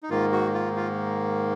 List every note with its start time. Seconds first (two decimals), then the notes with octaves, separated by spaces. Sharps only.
0.03 D#4
0.10 G#2 D#3 A#3 F4
0.32 F#4
0.54 F4
0.76 F4